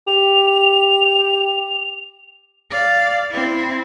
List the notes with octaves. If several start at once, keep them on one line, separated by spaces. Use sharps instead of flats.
G4 F7
D5 F5
C4 E4